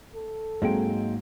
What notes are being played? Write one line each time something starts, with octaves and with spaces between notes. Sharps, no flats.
A4
G#2 F#3 G#3 A#3 C4 G5